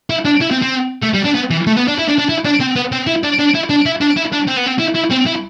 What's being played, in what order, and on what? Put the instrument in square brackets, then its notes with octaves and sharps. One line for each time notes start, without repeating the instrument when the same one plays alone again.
[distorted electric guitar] E4
D4
E4
C4
C4
A3
G3
D4
B3
E3
A3
B3
D4
E4
D4
D4
E4
D4
C4
B3
C4
E4
D4
D4
E4
D4
E4
D4
E4
D4
C4
B3
C4
E4
E4
C4
E4